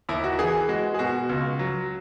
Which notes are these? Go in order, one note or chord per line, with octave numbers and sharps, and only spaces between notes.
D#2 E4
F#4
E3 G#4
G#3 F#4
G#4
B2 F#4
C#2
F#3